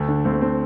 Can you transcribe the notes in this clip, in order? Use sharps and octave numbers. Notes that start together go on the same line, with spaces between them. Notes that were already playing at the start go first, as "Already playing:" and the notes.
Already playing: D2 A3
D3
D2 C4
A3
D3 C4